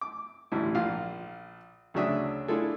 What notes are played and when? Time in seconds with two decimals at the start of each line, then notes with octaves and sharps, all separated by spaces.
0.01 D6
0.52 A1 D2 G#2 E4
0.75 A#1 F4 F5
1.94 D2 C#3 F#3 D4 E5 D#6
2.48 D4 E4 F4 G#4 A4